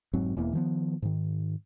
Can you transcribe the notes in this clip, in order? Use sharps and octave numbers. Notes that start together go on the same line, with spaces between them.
F1 G#2 F#3 C4
E1 E2 E3 A#3
D#3 F3 B3
G#2 D#3